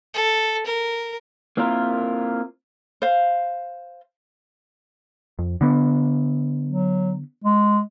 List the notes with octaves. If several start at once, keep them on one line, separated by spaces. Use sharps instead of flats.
A4
A#4
A#3 C4 E4 F4 A#4
C5 F5
F2
D3 B3
F#3
G#3